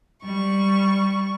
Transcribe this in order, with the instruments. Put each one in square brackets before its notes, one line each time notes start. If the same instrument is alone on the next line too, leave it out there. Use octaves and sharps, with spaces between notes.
[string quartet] G3 C#6